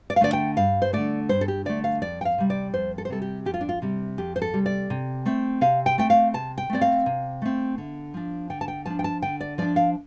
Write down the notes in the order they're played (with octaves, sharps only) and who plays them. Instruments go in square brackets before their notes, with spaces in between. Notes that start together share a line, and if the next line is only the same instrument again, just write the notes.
[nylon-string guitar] D5
F5
D3 A3 D5
G5
G2 F5
C5
D3 A3 D5
G2 C5
A4
G4
D3 A3 D5
F5
F2 D5
G5
F5
C3 G3
D5
F2 C5
A4
C5
C3 G3 A4
G4
F2 G4
F4
D4
F4
C3 G3
F2 G4
C5
A4
C3 G3
D5
C3
A3 C4
C3 F5
G5
A3 C4 G5
F5
C3 A5
G5
A3 C4 D5
F5
C3
A3 C4
D3
F3 D4
D3 G5
A5
G5
F3 D4 A5
G5
A5
D3 G5
D5
F3 D4 D5
F5